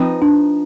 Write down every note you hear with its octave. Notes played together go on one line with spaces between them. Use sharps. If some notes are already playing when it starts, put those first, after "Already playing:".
Already playing: F3 C4 D#4 B4
D4